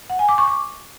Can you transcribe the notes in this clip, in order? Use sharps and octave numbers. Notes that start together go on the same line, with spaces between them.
F#5
G#5
D6
C#6
D6